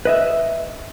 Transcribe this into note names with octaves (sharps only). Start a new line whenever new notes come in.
B4 D#5 E5